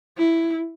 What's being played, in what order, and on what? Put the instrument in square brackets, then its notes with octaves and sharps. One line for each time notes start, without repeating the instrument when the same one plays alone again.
[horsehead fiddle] E4